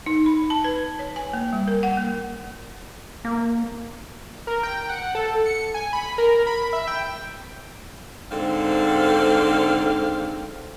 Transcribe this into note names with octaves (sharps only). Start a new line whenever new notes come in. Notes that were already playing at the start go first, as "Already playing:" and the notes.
D#4
B5
A5
B4
C#5
G#5
A#3
G3
A#4
F#5
A#3
A#3
A#4
G5
F#5
A4
C#7
G#5
B5
A#4
B5
E5
G5
G#2 D3 C4 A4 F5